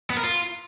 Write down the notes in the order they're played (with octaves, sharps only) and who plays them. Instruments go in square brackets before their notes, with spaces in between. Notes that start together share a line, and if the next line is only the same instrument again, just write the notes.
[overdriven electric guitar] B3
A#4
F4